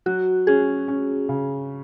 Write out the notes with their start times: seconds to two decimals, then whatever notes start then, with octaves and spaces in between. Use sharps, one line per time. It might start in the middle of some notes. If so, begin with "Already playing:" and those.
0.06 F#3 F#4
0.47 C#4 G#4
0.88 C#4
1.29 C#3